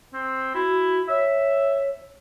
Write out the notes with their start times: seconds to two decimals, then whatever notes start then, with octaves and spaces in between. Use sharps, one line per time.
0.14 C4
0.55 E4 F#4
1.09 C#5 E5